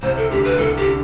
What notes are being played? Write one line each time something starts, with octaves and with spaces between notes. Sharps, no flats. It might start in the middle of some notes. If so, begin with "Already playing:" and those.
C2 C3 C5
A4
D2 D3 G4
B4
C2 C3 A4
G4
D3